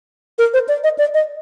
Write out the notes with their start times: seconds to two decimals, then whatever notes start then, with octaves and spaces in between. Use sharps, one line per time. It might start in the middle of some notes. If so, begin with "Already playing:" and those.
0.38 A#4
0.54 C5
0.68 D5
0.84 D#5
0.98 D5
1.14 D#5